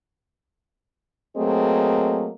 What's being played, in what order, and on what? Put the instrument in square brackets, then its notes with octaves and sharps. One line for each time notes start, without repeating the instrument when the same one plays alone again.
[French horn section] F#3 A3 A#3 C4 G#4 D#5